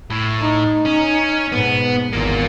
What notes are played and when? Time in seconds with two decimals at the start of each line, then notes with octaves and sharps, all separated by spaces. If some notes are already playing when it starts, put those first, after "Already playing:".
0.10 A2
0.41 D#4
0.86 C#4
1.52 G#2 B2 B3
2.13 G#1 E2 A#3 F4